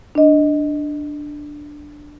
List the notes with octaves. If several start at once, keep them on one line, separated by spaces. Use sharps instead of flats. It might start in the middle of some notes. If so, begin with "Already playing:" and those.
D4 D#5